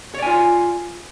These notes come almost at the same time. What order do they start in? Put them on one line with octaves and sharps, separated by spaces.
C#5 D5 G#5 F4